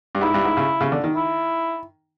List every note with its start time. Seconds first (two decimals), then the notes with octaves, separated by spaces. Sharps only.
0.15 G2
0.21 G#2 E4
0.34 G2
0.45 G#2
0.57 C#3
0.81 C#3
0.92 D3
1.04 D#3
1.16 E4